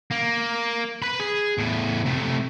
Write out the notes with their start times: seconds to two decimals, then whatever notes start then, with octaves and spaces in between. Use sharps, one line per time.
0.11 A#3
1.02 B4 B5
1.20 G#4
1.58 E2 A2
2.05 C3 A3